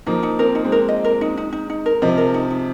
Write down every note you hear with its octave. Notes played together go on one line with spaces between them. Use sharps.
F3 A#3 D#4
D#4
C4 A#4
D#4
G#3 C4
A#4
D#5
A#4
D#4
D#4
D#4
D#4
A#4
C3 F3 D#5
A#4
D#4
D#4